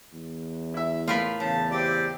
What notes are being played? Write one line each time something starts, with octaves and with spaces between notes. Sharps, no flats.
E2
E4 E5
A2 F4 A#4 B4
E2 C#3 A5
C4 G4 D5